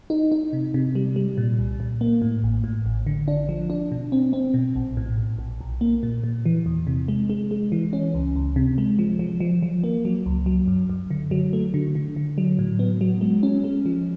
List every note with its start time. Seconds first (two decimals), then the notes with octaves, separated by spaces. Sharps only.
0.10 D#4
0.32 D#4
0.53 C3
0.74 C3
0.95 G3
1.16 G3
1.38 A#2
1.59 C2
1.80 A#2
2.01 A#3
2.22 A2
2.44 A1
2.64 A2
2.86 A1
3.06 D3
3.28 D4
3.49 F3
3.70 D4
3.92 B2
4.12 C4
4.33 C4
4.54 B2
4.76 A#1
4.97 A2
5.18 A#1
5.39 A#1
5.61 B1
5.81 A#3
6.03 A#2
6.24 A#2
6.45 E3
6.66 E2
6.87 C3
7.08 G#3
7.30 G#3
7.51 G#3
7.72 E3
7.93 C#4
8.14 C#2
8.36 C#2
8.56 C3
8.78 G#3
8.99 F3
9.19 F3
9.40 F3
9.62 F3
9.84 A#3
10.05 F#3
10.26 C#2
10.46 F#3
10.68 F#2
10.89 F#2
11.10 D3
11.31 F#3
11.53 A3
11.74 D3
11.95 D3
12.16 D3
12.38 F#3
12.59 A2
12.79 B3
13.01 F#3
13.21 G#3
13.43 C#4
13.64 G#3
13.86 F3